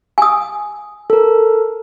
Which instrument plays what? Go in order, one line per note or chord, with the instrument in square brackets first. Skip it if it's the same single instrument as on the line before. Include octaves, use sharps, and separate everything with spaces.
[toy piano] G#5 D#6
[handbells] A4 A#4